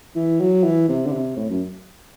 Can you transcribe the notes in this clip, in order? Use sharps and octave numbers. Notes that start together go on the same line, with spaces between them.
E3
F#3
E3
C3
D3
C3
A2
F#2